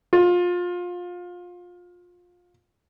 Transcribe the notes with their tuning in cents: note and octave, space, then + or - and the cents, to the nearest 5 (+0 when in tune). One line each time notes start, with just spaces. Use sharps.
F4 +25